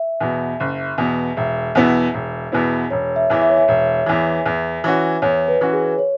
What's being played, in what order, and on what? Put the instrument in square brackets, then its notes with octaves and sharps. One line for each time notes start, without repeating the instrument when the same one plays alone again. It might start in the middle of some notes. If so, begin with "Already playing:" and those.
Already playing: [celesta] E5
[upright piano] E2 B2
F#1
E2 B2
[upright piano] E1 [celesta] E5
[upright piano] E2 B2 B3 E4
E1
E2 B2 B3 E4
[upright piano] E1 [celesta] C#5
[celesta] E5
[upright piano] E2 E3
[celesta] E5
C#5
E5
[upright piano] E1
E2 E3
E2
E3 C#4 F#4
[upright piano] E2 [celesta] C#5
[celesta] B4
[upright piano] E3 C#4 F#4
[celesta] G#4
C#5